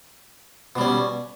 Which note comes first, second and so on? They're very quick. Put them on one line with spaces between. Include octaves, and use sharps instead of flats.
B2 G3 C#4